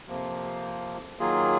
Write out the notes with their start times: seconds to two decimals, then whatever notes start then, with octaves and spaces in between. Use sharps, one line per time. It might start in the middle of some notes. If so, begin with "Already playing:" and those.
0.08 F2 C3 F3 A#3
1.19 D#3 F#3 A#3 F4 G#4